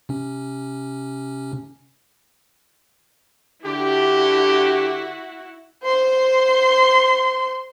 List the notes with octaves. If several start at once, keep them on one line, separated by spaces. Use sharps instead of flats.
C3 C#4
D3 E4 F#4 G4
C5 C6